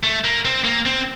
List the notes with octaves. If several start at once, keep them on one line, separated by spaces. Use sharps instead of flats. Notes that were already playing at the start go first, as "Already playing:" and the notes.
A3
A#3
C4
A#3
C4